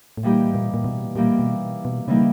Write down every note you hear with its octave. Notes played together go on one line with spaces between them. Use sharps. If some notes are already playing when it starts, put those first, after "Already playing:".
A2
A#2 E3 G3 A#3 D#4 G4
A2
A#2
A#2
B2
A#2 E3 G3 A#3 D#4 G4
B2
B2
C#3 E3 G3 A#3 D#4 G4